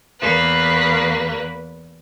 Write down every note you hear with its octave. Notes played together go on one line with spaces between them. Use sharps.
E2 A#3 B4